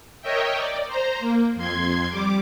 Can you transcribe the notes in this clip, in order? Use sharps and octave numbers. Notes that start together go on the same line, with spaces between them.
A#4 C#5 D#5 E5 G5
D5
C5 A#5
A#3
F2 C6 G#6
G3 D6